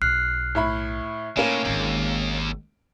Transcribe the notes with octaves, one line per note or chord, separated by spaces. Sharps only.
B1 F6 F#6 C7
A2 E4 B5
A2 A#3 C#4 D#4
G#1 D#2 C4